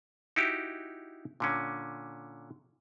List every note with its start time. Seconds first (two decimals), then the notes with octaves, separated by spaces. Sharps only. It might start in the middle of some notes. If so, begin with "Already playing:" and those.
0.36 D#4 E4 F#4 G4
1.40 A#2 D3 C#4